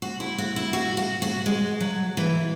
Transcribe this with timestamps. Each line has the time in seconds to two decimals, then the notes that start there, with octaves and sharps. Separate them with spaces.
0.02 F#4
0.20 E4
0.38 F#4
0.56 E4
0.73 F#4
0.97 F#4
1.22 F#4
1.46 G#3
1.80 F#3
2.17 E3